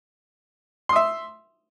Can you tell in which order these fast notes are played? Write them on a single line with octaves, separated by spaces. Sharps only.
C6 D#6 E5